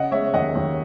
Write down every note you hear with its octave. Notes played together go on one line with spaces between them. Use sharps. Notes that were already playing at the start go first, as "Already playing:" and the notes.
Already playing: C#3 D#5 F#5
G#3 C#5 E5
D#2 D#5 F#5
D#2